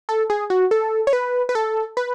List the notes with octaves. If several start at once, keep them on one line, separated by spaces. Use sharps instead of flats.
A4
G#4
F#4
A4
C#5
B4
B4
A4
B4